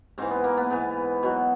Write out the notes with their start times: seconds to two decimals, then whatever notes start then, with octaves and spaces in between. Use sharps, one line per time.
0.18 G#2 E3 C4
0.31 B3
0.44 A#3
0.57 B3
0.70 G#2 E3 B3
1.23 B2 F#3